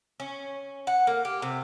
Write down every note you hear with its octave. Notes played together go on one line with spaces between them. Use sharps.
C#4
F#5
A#3
G4
C3